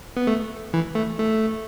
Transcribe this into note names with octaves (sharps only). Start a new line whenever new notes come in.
B3
A3
E3
A3
A3